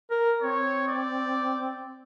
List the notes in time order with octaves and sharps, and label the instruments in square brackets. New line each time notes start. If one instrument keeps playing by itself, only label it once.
[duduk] A#4
[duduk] C4 [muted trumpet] C#5
[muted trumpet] D5